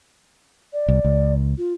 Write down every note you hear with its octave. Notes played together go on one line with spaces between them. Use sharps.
D5
C2
C#2
F4